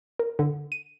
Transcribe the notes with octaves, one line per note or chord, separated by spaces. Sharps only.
A#4
D3
D#7